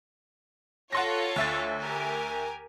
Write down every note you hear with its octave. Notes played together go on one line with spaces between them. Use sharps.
F4 A4 C#5 F#5 C6 A#6
D2 E5 A6
G4 A#4 G#5